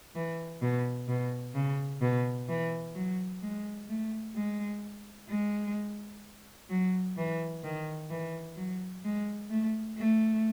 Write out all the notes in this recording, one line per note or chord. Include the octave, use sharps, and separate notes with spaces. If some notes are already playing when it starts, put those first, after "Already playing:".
E3
B2
B2
C#3
B2
E3
F#3
G#3
A3
G#3
G#3
F#3
E3
D#3
E3
F#3
G#3
A3
A3